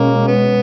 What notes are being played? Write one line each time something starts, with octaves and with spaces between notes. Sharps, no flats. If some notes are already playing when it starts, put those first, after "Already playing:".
Already playing: B2 G#3 A#3 C#4
B3